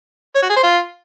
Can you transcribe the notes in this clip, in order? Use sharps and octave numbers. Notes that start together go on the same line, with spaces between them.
C#5
F#4
G#4
C5
F4